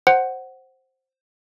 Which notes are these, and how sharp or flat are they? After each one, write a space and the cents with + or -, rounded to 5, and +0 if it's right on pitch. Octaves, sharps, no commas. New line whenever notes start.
C5 +10 F#5 +10